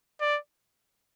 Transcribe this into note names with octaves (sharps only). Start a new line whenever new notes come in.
D5